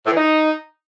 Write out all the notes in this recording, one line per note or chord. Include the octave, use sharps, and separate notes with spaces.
A2
E3
D#4